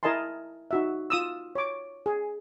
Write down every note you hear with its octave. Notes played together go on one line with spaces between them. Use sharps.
E4 A#4 D#5 G#5 A5 C6
D#4 F#4 E5
F4 D#6 E6
C#5 D6
G#4